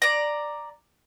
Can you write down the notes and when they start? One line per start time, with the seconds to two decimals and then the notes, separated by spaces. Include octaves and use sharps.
0.02 D5 A#5